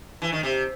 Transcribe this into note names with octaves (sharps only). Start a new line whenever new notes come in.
E3
D#3
C3